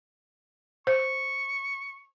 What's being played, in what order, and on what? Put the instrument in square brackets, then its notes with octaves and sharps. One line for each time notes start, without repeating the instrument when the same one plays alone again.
[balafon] C5 [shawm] C#6